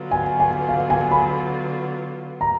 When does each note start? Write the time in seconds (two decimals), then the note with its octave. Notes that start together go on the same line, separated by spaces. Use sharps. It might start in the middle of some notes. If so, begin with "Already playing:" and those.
Already playing: D3 F#3 B3 F4
0.11 G#5
0.40 G#5
0.69 F5
0.90 G#5
1.11 B5
2.41 A#5